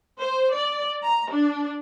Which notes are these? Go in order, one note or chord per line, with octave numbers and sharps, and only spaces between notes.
C5
D5
A#5
D4